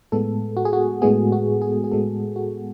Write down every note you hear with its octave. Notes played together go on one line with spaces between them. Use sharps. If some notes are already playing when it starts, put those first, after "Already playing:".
A2 G#3 B3 A4
F#4
G#4
F#4
A2 G#3 B3 G#4
F#4
G#4
G#4
A2 G#3 B3 A4
F#4